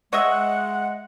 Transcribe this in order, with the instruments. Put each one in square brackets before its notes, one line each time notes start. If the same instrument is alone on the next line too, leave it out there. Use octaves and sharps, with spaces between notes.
[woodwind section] G#3 [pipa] C#5 D#5 E5 [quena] F#5